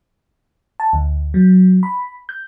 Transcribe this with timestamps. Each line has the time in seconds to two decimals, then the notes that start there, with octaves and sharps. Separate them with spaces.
0.80 A5
0.93 D2
1.34 F#3
1.83 B5
2.29 G6